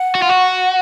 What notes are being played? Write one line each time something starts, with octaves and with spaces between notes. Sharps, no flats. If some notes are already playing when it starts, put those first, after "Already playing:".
Already playing: F#5
F#4
F4
F#4